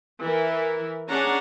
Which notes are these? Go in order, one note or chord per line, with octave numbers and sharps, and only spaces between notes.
E3 E4 A#4
C#4 D4 G#4 F#5 A#5